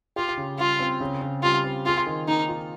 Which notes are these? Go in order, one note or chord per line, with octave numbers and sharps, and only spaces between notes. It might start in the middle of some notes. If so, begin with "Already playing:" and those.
F4 G4
C#3
G3 F4
C4
C#3
C#3
G3 F4
C4
F4 G#4
D#3
A#3 D#4
F4